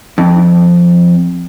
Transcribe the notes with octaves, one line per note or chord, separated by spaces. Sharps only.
F2